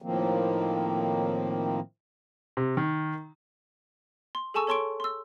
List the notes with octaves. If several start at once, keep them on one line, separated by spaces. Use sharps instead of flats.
A2 D#3 F3 A#3 C4
C3
D#3
C6
G#4 A4 G#5 A5 C#6 E6
A4 C#5 A5 C6 C#6 D7
C6 E6